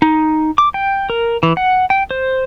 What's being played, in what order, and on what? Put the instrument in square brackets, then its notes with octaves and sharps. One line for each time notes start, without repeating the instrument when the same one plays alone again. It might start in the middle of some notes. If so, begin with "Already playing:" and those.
[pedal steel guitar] D#4
D6
G5
A#4
E3
F#5
G5
C5